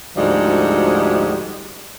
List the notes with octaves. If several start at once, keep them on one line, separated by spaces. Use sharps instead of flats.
D2 G#2 F3 G3 F#4 D#5